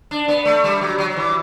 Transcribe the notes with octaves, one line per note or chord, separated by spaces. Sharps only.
D4
B3
A3
G3
F#3
F#3
F#3
E3